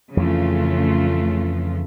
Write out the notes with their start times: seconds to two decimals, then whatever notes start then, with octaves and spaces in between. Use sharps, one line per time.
0.17 F2 C#3 E3 A3 F4